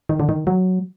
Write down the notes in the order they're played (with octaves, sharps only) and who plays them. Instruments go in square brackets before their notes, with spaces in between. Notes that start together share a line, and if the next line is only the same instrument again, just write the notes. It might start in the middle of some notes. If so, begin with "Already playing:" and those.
[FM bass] D#3
D3
D#3
F#3